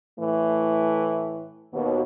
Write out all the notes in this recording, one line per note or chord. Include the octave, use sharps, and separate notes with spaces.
A2 E3 A3
D#2 B2